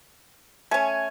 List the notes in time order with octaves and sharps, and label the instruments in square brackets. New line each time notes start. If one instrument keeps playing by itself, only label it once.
[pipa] A3 C#4 [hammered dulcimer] G#5